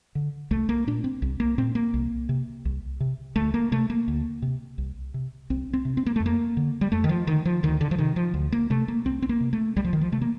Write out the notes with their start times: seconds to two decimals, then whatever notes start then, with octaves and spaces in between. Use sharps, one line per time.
0.15 D3
0.51 C2 A3
0.69 A#3
0.87 A#2 D4
1.04 C4
1.22 C2
1.40 A#3
1.58 A#2 C4
1.75 A#3
1.94 C2
2.29 C3
2.65 C2
3.00 C3
3.36 D2 A3
3.54 A#3
3.72 C3 A3
3.90 A#3
4.08 D2
4.42 C3
4.78 C2
5.14 C3
5.50 C2 C4
5.73 C4
5.85 C3
5.97 C4
6.06 A#3
6.16 F2 A3
6.26 A#3
6.57 D3
6.81 G3
6.92 F2 A3
7.04 D#3
7.09 F3
7.27 D3 D#3
7.45 F3
7.63 D2 D#3
7.81 D3
7.91 F3
7.98 C3 D#3
8.16 F3
8.34 D2
8.52 A#3
8.70 C3 A3
8.88 A#3
9.05 C2 C4
9.22 C4
9.29 A#3
9.40 C3
9.53 A3
9.76 C2 G3
9.85 F3
9.93 D#3
10.01 F3
10.12 C3 A3
10.21 A#3